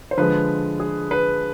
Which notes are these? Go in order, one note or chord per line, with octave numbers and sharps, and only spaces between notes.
C5
D3 F3 G#3 B4
G#4
B4